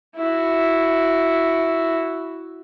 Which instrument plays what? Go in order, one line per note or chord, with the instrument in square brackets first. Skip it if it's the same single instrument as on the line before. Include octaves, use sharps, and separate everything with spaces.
[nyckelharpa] E4 F#4